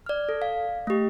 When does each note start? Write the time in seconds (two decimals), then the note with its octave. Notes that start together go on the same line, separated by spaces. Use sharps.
0.06 D5 F6
0.29 A4
0.42 F5
0.87 A3 G4